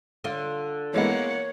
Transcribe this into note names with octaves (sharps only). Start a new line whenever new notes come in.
D3 F4
E3 G#3 A#3 B3 C#5 F#5